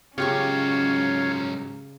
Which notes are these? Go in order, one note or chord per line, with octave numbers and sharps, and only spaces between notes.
G#2 C#3 F#3 C#4 F4 G4 C#5 C#6